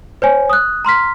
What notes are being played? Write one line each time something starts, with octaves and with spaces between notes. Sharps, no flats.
C5 C#5 G#5
D#6 F#6
A#5 C6 F6 B6